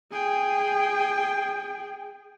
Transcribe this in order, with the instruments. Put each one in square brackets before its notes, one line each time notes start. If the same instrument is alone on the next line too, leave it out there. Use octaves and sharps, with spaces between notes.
[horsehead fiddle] G#4 G5